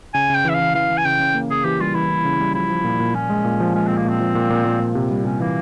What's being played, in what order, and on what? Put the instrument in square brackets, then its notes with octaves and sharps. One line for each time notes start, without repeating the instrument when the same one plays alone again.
[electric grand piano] C#3 [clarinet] G#5
[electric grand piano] C#3 [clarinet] G5
[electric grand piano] E3 [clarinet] E5
[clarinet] F5
[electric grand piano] E3
[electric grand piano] E3 [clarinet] F5
[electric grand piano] E3
[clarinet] G#5
[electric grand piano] C#3 [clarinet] G5
[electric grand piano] C#3
A#3
[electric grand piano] C#3 [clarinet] G#4
[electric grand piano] E3 [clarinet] G4
[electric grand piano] G3 [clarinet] F4
[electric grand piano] E3 [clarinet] E4
[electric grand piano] A#3
C#3
G3
[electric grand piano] F3 [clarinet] E4
[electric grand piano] F3
A#2
A#2
[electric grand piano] A#2 [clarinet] C#4
[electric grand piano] G#3
A#2
F3
[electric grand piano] G#3 [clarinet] C#4
[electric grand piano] A#2 [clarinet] C4
[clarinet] A#3
[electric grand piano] A#2 [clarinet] C4
[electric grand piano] F3
A#2
A#2
A#2
A#2
C3
G3
[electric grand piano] C3 [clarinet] C#4
[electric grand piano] E3 [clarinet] A#3